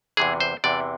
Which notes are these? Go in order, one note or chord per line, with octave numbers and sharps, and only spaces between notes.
E2 C3 E3 G#4
C5
E2 C3 E3 D5